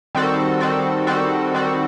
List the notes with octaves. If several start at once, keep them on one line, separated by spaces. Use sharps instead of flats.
D#3 G3 C4 F#4 A4
D#3 G3 C4 F#4 A4
D#3 G3 C4 F#4 A4
D#3 G3 C4 F#4 A4